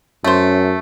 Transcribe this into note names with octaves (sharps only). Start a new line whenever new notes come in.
F#2 A3 C#4 C5